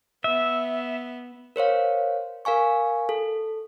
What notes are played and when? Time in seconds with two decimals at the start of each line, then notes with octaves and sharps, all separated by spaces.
0.24 B3 E5
1.56 A#4 C5 C#5 F5
2.45 A#4 F5 G#5 C#6
3.09 A4